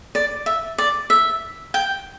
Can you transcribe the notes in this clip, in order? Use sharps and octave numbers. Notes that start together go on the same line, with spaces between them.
D5
E5
D5
E5
G5